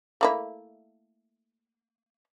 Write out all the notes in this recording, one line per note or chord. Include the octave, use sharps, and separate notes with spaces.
A3 A#3 E4